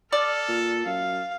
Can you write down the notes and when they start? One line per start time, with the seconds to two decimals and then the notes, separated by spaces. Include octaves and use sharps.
0.12 A4 D5 F6
0.48 A#2
0.85 F#2 F5